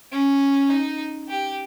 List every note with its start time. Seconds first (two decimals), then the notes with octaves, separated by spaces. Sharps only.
0.13 C#4
0.70 D#4
1.29 G4